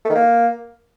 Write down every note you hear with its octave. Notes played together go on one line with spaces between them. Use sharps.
A3
D#3
A#3